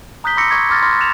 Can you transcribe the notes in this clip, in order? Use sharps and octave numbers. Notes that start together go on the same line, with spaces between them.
A#5 D#6 F#6 G6 B6 G7
B5 C6 D6 E6 A#6 C#7
C#6 D6 G#6
C6 D6 F6 A6 A#6
B5 C6 D6 F6 A6 A#6
C6 F#6 A6 E7 F7